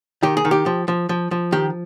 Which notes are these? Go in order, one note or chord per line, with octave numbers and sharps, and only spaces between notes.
D#3 G4
G#4
D#3
G4
F3
F3
F3
F3
D#3 G4